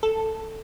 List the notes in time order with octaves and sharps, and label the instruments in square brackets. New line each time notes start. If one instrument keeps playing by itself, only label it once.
[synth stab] A4